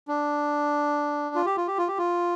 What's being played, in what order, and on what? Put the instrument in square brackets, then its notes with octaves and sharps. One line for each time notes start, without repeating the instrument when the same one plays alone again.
[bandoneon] D4
F4
G4
F4
G4
F4
G4
F4